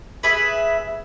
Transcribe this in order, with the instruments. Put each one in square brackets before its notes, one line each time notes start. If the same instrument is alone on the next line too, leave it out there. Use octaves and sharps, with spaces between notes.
[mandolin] G#4 B4 E5 G#5